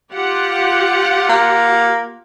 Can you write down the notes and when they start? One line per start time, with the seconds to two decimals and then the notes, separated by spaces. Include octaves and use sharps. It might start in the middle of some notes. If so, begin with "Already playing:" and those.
0.13 F4 G4 F#5
1.29 A#3